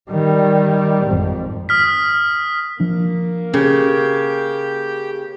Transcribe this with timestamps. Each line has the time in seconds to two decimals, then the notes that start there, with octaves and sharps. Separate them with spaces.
0.10 D#3 G3
1.06 G#1 F2
1.69 D#6 F6 B6
2.80 F3 A#3 D4
3.54 C#3 C#4 G4